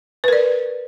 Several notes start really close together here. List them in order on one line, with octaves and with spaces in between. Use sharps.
B4 A#4 D5